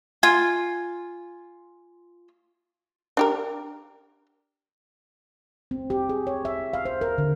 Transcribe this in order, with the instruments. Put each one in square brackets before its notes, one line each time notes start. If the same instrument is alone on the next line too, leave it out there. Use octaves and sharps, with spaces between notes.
[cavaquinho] F4 G#5
[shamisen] D4 G4 A#4
[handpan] C4
G4
G#4
C#5
E5
F5
C5
A#4
D3